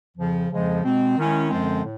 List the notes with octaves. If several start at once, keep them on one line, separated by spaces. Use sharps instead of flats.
F2 C#3 F3
F2 C#3 F3 G#3
B2 G#3 C4
D#3 G#3 C#4 E4
F#2 D3 F3 G#3 C4
A2